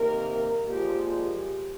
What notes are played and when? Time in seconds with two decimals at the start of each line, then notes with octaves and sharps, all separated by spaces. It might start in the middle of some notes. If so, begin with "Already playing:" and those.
Already playing: C3 D#3 A#3 A#4
0.67 A#2 F3 G#3 G4
1.10 G4